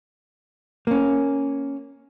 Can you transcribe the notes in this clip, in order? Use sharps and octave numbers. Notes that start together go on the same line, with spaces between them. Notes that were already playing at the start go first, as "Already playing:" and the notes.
A#3 C#4